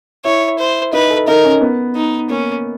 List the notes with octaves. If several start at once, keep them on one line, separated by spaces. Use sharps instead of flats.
E4 C#5
C5
D#4 B4
A4
D#4 A#4
C#4
B3
D#4
A#3 C#4